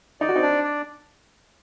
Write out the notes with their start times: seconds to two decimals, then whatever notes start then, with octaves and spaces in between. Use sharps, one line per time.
0.21 D#4 D5
0.29 F#4
0.36 C4 D#4
0.42 D4
0.64 D5